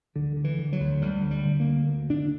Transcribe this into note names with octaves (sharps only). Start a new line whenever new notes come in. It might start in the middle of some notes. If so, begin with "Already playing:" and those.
D2 D3
D3
E3
D3
F#3
D2
D2 G3
D3
G3
D3
A#3
D2
D2
D3 D4